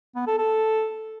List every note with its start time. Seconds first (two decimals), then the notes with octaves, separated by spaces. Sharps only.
0.15 B3
0.27 A4
0.38 A4